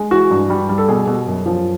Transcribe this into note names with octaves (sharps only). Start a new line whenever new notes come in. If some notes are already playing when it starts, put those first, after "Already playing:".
Already playing: G#3
E3 F#4
G2
G3
G3
A4
B2 G#4
B2
F#2
F3